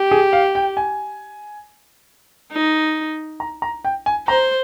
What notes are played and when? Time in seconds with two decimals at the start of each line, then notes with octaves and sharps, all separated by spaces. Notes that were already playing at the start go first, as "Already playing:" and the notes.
Already playing: G4
0.11 G#4
0.33 F5
0.55 G5
0.77 G#5
2.53 D#4
3.40 A#5
3.62 A#5
3.85 G5
4.06 G#5
4.28 C5 A#5